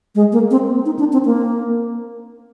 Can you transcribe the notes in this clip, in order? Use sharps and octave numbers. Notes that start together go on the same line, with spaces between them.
G#3
A#3
C4
D#4
D4
C4
A#3